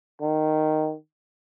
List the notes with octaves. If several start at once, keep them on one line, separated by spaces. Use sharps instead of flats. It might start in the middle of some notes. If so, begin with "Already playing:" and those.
D#3